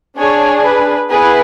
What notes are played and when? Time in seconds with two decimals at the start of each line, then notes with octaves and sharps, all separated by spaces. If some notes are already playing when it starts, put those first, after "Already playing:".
0.17 D4 G#4 C#5
0.64 B4
1.09 B3 E4 G#4 B4